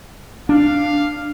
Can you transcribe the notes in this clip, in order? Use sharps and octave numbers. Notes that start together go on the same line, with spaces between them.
D4 F5